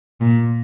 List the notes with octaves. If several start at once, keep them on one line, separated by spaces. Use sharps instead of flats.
A#2